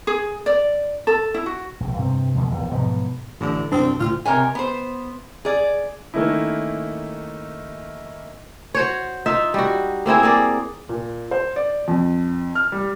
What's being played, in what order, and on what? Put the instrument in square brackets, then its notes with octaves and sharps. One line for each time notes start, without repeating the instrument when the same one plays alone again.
[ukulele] G#4
D5
A4
E4
F#4
[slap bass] A#1
G2 C3 C4
D2 B2 F3 G#3
A#1 E2 G2
G#2 B2 F3 F#3
[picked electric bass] A1 [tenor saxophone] D3
[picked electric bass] C2 F#2 D4 [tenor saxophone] C4
[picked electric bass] D2 A2 [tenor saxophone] F4
[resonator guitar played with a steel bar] C3 A#4 C#5 G#5
B3 C5
G#4 D5
[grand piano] D#3 A3 A#3 C#4 D#4 E4
[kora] F#4 C5 C#5
D#4 F4 E5
G3 F#4
A#3 C4 E4 G#4
A#3 G#4 D5
[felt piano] A#2
C5
D5
F2
F6
G3